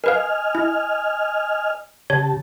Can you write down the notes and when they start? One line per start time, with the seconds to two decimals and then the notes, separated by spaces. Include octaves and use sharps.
0.04 A#4 B4 D#5 F5 G#5 F6
0.55 E4
2.10 C#3 G4 C#5 A5